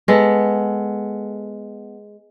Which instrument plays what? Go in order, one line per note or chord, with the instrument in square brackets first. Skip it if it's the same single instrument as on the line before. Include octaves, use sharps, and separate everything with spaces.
[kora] G#3 B3 A4